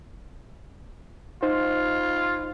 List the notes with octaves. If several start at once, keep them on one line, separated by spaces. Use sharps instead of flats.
D#4 F4 C5